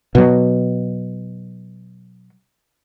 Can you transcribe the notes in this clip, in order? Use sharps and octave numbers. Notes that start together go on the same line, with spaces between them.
B2 F#3